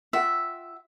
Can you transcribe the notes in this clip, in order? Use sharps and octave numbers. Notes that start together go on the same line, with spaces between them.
F4 E5 F#5 G5